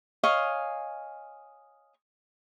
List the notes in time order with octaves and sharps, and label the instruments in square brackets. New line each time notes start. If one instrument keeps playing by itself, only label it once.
[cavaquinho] C#5 D#5 F5 G#5